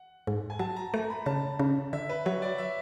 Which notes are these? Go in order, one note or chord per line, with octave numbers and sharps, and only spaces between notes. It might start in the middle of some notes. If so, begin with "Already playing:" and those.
Already playing: F#5
G#2
G#5
F#3 A5
A#5
A3 A#5
B5
C#3 A5
C#3
D3 E5
B4
F#3 C#5
D5
E5